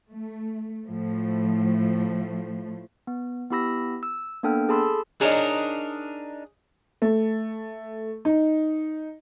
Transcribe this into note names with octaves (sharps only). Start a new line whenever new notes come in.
A3
A2 F3 A3
B3
B3 E4 G4 B5 E6 A#6
E6
A#3 B3 D4 A4 G5 F6
G#4 A4 A5 B5 C6 E6
D4 D#4 G#4 A#4 C#5 D#5
A3
D#4